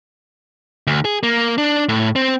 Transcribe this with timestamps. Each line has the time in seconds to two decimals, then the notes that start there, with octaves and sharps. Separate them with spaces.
0.87 D2
1.05 G#4
1.23 A#3
1.58 D4
1.89 A2
2.16 C4